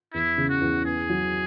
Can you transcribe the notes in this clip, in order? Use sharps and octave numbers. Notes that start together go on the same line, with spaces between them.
E2 E4
C#3
F#4
E2
B3 G#4
F#3